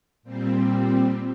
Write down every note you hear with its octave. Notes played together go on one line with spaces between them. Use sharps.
A#2 G3 C4